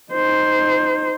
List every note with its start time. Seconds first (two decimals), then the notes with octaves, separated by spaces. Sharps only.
0.12 D#4 C5